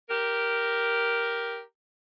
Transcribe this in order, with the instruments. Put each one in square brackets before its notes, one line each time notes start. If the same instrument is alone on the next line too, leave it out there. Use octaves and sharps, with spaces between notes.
[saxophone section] G4 A#4